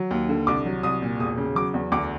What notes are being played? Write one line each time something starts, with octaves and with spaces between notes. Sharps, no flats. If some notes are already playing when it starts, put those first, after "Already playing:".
Already playing: F#3
D#2
D3
C2 D6
F#3
C2 D#6
A#2
E1 D#6
C#3
F#3 D6
E2
D2 D6